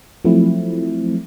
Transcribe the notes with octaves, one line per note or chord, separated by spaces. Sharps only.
F3 F#3 A3 C4 E4